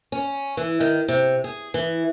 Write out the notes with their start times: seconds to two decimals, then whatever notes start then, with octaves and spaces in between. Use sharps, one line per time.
0.12 C#4
0.57 E3
0.80 D#3
1.08 C3
1.44 G#4
1.74 E3